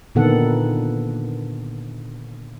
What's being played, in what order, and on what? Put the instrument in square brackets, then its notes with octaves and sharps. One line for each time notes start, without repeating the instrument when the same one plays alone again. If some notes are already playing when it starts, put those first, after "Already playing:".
[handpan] A#2 D3 D#3 B3 A4 F#5